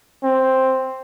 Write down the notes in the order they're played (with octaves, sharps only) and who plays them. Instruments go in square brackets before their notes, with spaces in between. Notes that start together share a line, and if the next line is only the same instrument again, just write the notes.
[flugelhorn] C4